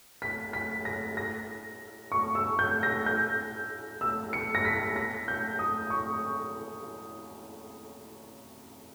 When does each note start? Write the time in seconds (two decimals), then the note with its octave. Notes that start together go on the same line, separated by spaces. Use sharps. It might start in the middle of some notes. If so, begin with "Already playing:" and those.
0.22 B6
0.53 B6
0.85 A#6
1.17 A#6
2.12 C#6
2.35 E6
2.59 G6
2.83 A#6
3.06 G6
4.01 E6
4.33 C#7
4.55 A#6
4.65 B6
4.96 A#6
5.28 G6
5.59 D#6
5.90 C#6